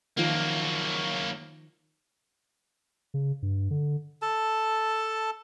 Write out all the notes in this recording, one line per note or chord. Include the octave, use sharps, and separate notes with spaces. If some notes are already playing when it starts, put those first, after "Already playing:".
D#3 F3 F#3 A#3 A#4
C#3
G2
D3
A4 A5